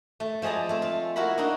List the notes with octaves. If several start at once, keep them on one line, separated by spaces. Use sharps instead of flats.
A3
F3 G#3 G#4 D5 A#5
A3 C4
F4
A#3 E4 F#4 A#4 B5
A#3 D4 D#4 F#4